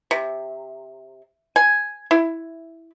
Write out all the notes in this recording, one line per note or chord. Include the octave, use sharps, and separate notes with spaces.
C3
G#5
E4